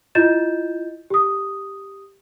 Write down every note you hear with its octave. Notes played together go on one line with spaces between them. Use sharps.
E4 F4 D#5 G6 A6 E7
G4 D#6